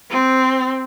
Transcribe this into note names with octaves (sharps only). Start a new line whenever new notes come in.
C4